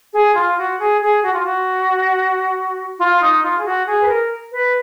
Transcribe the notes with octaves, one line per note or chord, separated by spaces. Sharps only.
G#4
F4
F#4
G#4
G#4
F#4
F4
F#4
F4
D#4
F4
G#4
F#4
G#4
B4
A#4
B4